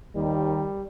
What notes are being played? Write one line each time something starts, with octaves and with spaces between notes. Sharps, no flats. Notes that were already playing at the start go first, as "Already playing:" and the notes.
D#2 D#3 G3